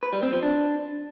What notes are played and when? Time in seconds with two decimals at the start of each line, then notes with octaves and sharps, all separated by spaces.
0.03 B4
0.13 G3
0.23 C4
0.33 F3
0.43 D4